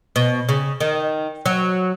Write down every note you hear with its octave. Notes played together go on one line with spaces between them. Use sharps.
B2
C#3
D#3
F#3